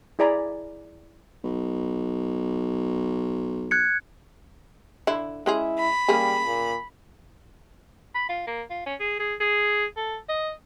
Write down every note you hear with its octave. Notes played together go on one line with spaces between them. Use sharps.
E4 G#4 D5 G#5 A#5 B5
B1
F#6 G#6 C#7
D3 E4
G#3 C#4 E4 G#4
B5
C#3 G3 A#3 G#4
A#2
B5
F4
A#3
F4
C#4
G#4
G#4
G#4
A4
D#5